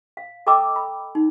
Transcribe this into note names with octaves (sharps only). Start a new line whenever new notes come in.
F5
A4 D#5 G5 A#5 D6 E6
B5
D#4